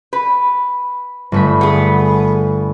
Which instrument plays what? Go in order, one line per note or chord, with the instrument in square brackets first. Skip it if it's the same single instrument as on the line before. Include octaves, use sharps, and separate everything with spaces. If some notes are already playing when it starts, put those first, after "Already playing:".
[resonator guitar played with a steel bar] B4
[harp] G1 A3 B5
[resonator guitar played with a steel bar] B3 G#4